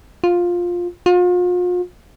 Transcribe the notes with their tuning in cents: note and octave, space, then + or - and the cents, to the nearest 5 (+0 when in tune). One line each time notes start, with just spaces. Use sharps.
F4 +10
F4 +40